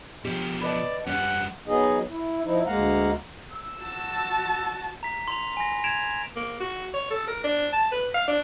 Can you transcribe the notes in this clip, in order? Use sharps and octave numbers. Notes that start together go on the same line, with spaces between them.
B2 F3 G4
B4 D5 D#5 A5
F#2 G3 C#4 F#5
F#3 B3 D#4 G#4 D#5
E4
F3 D#4 E4
D2 G#3 A#3 F5 F#5 A#5
E6
F#4 A5
A#5 B6
C6 F7
G#5 B5 A#6
G#6 D7 E7 F7
A#3
F#4
C#5
A4
A#4
D4
A5
B4
F5
D4